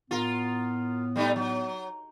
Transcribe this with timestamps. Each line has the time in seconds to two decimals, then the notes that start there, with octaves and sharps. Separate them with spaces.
0.11 A2 B3 F4 A#4
1.16 G3 A3 D#4
1.36 F#3